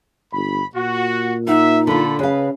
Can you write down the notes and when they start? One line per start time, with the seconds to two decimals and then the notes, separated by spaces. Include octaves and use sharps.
0.33 G1 B5
0.75 A#2 F#4
1.47 D#4 E5 F#5
1.87 D3 F4 A4 B5
2.19 C#3 G#4 B4 F5